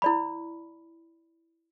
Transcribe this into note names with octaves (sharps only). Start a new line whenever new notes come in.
E4 D5 B5